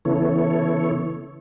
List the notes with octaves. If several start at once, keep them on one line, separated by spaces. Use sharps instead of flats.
C#3 E3 B3 E4 A4 C#5